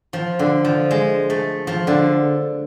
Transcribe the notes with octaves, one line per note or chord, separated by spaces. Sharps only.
F3
D3
F3
G#3
A3
F3
D3